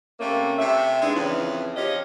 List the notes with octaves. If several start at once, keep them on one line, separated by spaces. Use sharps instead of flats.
C3 A3 A#3 C#4
C3 A3 E5
G#3 B3 D4 D#4
F2 C#3 E3
F3 G4 C#5 D#5